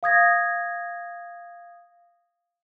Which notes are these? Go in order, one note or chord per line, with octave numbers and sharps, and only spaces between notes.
F5 D#6 G#6 A#6